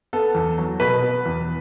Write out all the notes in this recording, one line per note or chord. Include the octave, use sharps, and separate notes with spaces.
B3 A4
E2
F#3
B2 B4
B3
E2